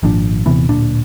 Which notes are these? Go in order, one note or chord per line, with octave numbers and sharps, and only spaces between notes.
G#1 A#2 F3 D4
D#1 C3 E3 B3
D1 A#2 D4